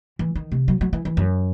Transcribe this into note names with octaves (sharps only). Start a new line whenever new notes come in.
E3
D#3
C3
F#3
F#3
E3
E3
F#2